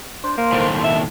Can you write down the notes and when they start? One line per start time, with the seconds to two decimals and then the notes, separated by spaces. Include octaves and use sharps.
0.24 D4 C5
0.38 A#3
0.53 D#2 A2
0.84 E5